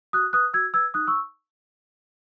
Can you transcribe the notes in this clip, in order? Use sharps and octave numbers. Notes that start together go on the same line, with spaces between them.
F#4 D#6 F#6
B4 D#6 F#6
F#4 E6 G#6
B4 E6 G#6
D#4 D#6 F#6
C#6 E6